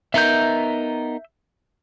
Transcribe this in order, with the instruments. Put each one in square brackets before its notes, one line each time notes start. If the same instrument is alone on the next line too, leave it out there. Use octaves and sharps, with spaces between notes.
[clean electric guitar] B3 D#4 A#4 [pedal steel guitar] E5 G6